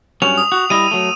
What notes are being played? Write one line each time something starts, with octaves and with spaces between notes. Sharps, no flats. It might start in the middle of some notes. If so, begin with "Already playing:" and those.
G2 F#3 C#4 F7
D#6
F#4
G3 E4 D#5 D#7
F#3 A3